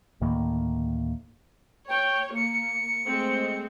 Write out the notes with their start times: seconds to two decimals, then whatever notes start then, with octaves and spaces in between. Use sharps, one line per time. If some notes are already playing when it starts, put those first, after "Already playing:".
0.21 D2 A2 D#3 A#3
1.89 C#5 G5
2.36 A#3 C#7
3.06 G#3 A3 C4